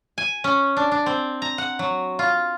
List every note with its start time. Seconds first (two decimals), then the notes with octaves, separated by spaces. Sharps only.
0.18 G#5
0.44 C#4
0.77 D4
0.92 D4
1.06 C4
1.42 A#5
1.58 F#5
1.79 F#3
2.19 F4